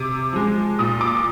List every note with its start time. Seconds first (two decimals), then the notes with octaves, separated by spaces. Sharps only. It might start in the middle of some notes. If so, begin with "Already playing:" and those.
Already playing: C3 D6
0.33 F3 G#3
0.79 A#2 D#6
1.01 D6